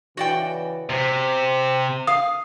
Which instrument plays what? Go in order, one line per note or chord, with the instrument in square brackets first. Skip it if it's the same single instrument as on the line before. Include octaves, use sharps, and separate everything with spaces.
[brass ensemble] C#3 E3 [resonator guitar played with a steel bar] F#4 D5 G5
[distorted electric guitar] C3 [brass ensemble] C5
[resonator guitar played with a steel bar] F5 [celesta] D#6